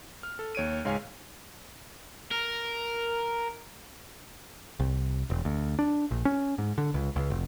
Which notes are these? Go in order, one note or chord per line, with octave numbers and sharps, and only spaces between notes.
F6
A4
D#2 C#5 D7 D#7
C#2 G#2 C#5 F5 G#5
A#4
C2
E1
D2
D4
A#1
C#4
G#2
D3
C#2
C#2
F1